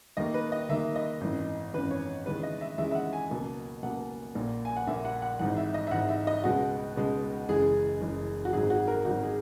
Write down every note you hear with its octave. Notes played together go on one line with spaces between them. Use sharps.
D#2 D#3 A#3 D#5
B4
D#5
D#2 D#3 A#3 E5
D#5
G#1 F#2 E3
G#1 F#2 E3 B4
C#5
D#2 C#3 E3 G#3 B4
D#5
E5
D#2 C#3 E3 G#3 E5
E5
F#5
G#5
C#2 B2 F#3 A#3
C#2 B2 F#3 A#3 F#5
A#1 A#2 A#3
G#5
F#5
A#1 A#2 A#3 E5
F#5
F#5
G#1 G#2 E3 F#5
E5
D#5
E5
G#1 G#2 E3 F#5
E5
D#5
C#2 B2 G#3 F#4
C#2 B2 G#3
F#1 F#2 E3 G#3 G#4
F#1 F#2 E3 G#3
F#4
G#1 G#2 F#3 G#4
F#4
A#4
G#1 G#2 F#3 F#4
G#4